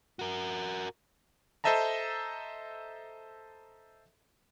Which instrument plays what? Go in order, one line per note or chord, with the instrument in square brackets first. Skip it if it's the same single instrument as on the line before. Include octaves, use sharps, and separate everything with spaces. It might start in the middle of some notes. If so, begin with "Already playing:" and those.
[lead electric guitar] F#4 A#4
[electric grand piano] A4 C5 D#5 E5 A5 A#5